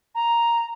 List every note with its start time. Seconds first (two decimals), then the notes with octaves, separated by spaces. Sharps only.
0.14 A#5